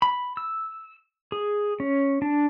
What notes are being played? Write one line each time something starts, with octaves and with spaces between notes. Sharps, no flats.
B5
E6
G#4
C#4
D4